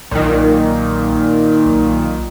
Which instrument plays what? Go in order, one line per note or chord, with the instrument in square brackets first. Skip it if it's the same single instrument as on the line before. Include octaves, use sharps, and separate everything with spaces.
[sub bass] B1 [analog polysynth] A#2 D#3
[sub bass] B1